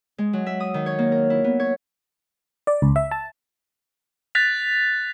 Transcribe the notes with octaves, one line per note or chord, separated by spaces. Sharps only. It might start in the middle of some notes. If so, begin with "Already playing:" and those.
G#3
F#3
E5
D#6
D#3
C#5
A#3
A#4
E4
B3
C#5
D5
C#2
E5
A5
F#6 A6 B6 F7